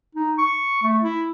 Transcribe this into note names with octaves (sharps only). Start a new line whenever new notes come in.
D#4
C#6
A3
E4